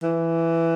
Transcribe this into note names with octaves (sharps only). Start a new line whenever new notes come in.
E3